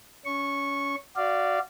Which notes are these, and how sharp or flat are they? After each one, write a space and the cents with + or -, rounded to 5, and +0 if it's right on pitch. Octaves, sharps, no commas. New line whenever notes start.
C#4 +25 C#6 -10
F#4 +0 D5 +0 F5 -25